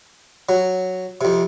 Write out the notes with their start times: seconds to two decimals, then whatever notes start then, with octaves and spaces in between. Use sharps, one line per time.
0.49 F#3
1.21 F2 C3